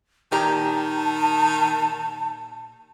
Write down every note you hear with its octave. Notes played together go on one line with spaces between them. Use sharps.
A#2 D#3 G4 A5 A#5